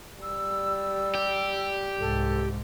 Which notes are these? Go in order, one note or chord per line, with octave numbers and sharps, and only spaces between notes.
G3 E6
G4
C2 G#2 A4